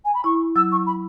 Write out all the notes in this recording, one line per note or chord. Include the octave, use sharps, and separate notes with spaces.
G#5
B5
E4 C#6
F#3 E6
C#6
B5